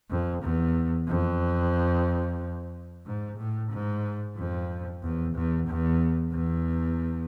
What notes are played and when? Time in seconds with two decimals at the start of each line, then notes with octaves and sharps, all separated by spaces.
0.10 F2
0.43 E2
1.08 F2
3.06 G#2
3.38 A2
3.72 G#2
4.37 F2
5.03 E2
5.35 E2
5.67 E2
6.33 E2